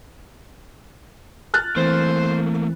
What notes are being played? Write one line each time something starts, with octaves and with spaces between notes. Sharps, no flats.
F6 F#6 A6
E3 A3 A#3 C4 C5